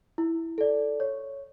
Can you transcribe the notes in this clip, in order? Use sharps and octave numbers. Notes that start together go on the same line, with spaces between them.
E4
A4 D5
C#5